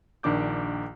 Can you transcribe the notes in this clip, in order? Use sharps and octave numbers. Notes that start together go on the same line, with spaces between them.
A#1 D#3 D4 D6 G6